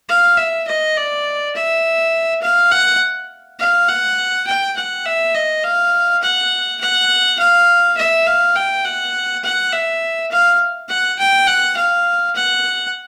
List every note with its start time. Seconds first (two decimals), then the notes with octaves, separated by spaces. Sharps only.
0.08 F5
0.37 E5
0.67 D#5
0.96 D5
1.55 E5
2.42 F5
2.71 F#5
3.59 F5
3.88 F#5
4.47 G5
4.76 F#5
5.05 E5
5.34 D#5
5.63 F5
6.22 F#5
6.81 F#5
7.39 F5
7.97 E5
8.27 F5
8.55 G5
8.84 F#5
9.44 F#5
9.73 E5
10.31 F5
10.89 F#5
11.18 G5
11.47 F#5
11.76 F5
12.35 F#5